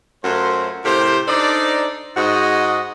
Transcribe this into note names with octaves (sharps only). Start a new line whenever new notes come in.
F#2 A3 F4 F#4 C5
A2 C3 G4 A#4 C5
D4 D#4 A4 C5 D5
G#2 F#4 D#5